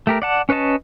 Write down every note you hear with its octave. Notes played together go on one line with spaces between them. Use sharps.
A3 G4 A#4
D5 F#5 A5
C#4 B4 C#5 D#5 A5